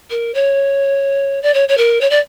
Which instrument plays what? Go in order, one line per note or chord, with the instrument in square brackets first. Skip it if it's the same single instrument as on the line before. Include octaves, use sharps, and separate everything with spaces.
[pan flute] A#4
C#5
D5
C#5
C#5
A#4
C#5
D5